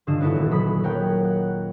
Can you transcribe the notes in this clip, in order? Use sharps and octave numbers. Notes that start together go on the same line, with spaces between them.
G2 D3 C#4 F4 D#5 E7
B3 C#4 D#4 E4 F#4 A4
D#1
F#3 B5 D#6 B6
A#4 C#5 F#5 G5
F#5